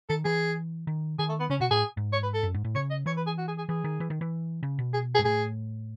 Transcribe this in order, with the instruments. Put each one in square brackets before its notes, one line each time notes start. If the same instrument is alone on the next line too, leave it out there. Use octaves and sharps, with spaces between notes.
[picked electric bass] D#3 [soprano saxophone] A4
[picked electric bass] E3 [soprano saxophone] G#4
[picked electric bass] D#3
[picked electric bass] D#3 [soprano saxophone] G#4
[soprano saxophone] A3
B3
[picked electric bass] C#3 [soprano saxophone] C#4
[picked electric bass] B2 [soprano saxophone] F#4
[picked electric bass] A2 [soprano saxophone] G#4
[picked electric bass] G#2
[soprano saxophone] C#5
B4
A4
[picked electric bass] F#2
G#2
A2
[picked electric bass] C#3 [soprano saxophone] C#5
[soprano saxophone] D#5
[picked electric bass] E3 [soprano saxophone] C#5
[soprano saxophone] B4
G#4
F#4
G#4
G#4
[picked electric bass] E3 [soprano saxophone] G#4
[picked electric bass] D#3
E3
D#3
E3
C#3
B2
[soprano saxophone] G#4
G#4
[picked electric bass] G#2
[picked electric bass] A2 [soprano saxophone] G#4